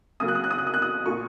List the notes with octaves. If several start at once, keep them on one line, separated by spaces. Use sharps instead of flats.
C#3 F#3 A#3 D#6
F#6
D#6
F#6
D#6
F#6
D#6
F#6
D#6
A#2 A#3 C#6